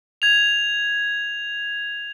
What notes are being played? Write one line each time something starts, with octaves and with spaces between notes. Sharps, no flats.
G#6 F7